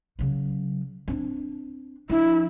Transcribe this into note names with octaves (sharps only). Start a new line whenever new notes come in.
C#3 F#3
C4 D4
F3 D4 E4